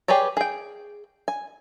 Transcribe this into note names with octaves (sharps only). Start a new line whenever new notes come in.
G4 G#4 B4 C#5 D5
G#4 G5
G#5